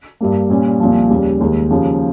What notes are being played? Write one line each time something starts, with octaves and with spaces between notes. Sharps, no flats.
G2 G3 A#3
A#2 G3 C#4
C2 A#2 F3
D#2 C#3 G3
D#2 D#3 G#3
D#2 C#3 F3